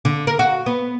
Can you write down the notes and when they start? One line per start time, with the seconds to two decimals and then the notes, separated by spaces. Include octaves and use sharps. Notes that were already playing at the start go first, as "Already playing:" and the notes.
0.05 D3
0.27 A#4
0.39 F#4
0.66 B3